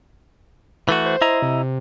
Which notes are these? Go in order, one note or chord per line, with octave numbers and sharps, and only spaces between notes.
E3 A3 F#4
C5
E4 D#5 A#5
C3